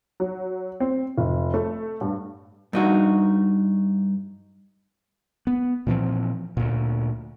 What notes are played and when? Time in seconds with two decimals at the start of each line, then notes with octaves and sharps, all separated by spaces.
0.20 F#3
0.80 C4
1.18 F1
1.54 A3
2.01 G2
2.73 G2 D#4 F#4
5.47 B3
5.87 A#2 E3 F3 C4
6.57 D2 A#2